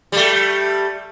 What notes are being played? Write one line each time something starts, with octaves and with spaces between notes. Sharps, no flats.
G3 A3